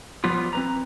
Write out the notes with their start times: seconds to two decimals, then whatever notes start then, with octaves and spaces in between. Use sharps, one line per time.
0.24 F3 G3 B3 F4
0.53 C4 B4 A#5